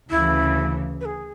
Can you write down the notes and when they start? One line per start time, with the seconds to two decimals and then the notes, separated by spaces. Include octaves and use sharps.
0.10 D2 C#3 E3 E4
1.01 B4
1.05 G#4